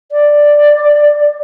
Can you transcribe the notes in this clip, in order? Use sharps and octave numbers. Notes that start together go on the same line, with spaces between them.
D5